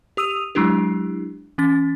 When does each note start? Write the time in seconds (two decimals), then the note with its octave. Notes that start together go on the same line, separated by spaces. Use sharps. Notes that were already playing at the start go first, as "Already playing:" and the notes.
0.17 G4 D#6 E6 D#7 F7
0.55 F#3 G#3 D4 E4 G4
1.58 E3 C#4 A6